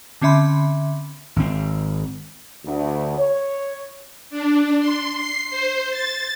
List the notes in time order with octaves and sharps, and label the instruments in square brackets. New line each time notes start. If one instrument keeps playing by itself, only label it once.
[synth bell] D3 C4 C#4 E5 B5 C6
[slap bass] G#1 C4
[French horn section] D2
C#5
[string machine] D4
C6
C7
C5
A6